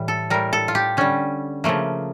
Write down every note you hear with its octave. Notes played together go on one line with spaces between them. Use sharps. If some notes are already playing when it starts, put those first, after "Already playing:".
Already playing: A2 E3 G3
A4
A2 G3 A#4
A4
F4
G4
D3 G3 C#4
C#3 F3 A3 A#3